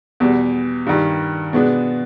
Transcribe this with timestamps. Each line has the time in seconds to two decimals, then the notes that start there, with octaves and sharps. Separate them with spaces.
0.20 E2 B2 G3
0.87 G2 D#3 G3
1.53 B2 G#3 B3 D4